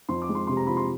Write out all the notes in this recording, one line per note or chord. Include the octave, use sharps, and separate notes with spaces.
F2 C6
D6
G#3
C6
C3 C6
A#5
F3 B5
C6